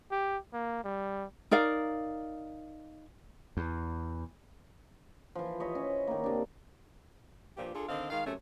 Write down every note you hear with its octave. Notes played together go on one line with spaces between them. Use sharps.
G4
A#3
G3
D#4 A#4 D5 F5
E2
E3 F3
C#5 D#5 E5 B5
C#4
D#3 A#3
C3 D4
G2 A#2 F3 G4
D4 F4 G#4 A4
D3 D#3 C4 D#5 F5
D#3 G#3 F5
F#2 C3 A3 C#4